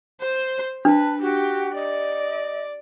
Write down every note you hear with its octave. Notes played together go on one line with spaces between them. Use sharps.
C5
D4 B4 A5
F#4 G4
D5 D#5